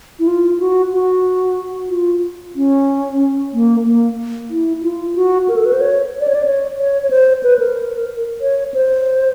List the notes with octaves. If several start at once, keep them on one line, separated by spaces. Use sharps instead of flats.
E4
F4
F#4
F#4
F4
C#4
A#3
A#3
E4
F4
F#4
A#4
A4
B4
C5
C#5
D5
C#5
D5
C#5
C#5
C#5
C5
B4
A#4
C#5
C5